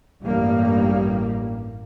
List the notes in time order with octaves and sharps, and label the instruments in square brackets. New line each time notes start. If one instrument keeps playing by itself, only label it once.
[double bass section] A1 G2 G3 A#3